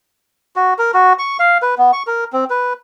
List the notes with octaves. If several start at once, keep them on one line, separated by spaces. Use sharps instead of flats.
F#4
A#4
F#4
C#6
F5
B4
B3
C#6
A#4
C4
B4